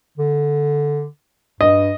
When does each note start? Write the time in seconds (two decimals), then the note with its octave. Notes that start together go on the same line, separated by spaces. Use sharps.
0.17 D3
1.61 G2 D#5